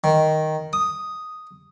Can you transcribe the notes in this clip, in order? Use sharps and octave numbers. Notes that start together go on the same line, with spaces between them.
D#3
D#6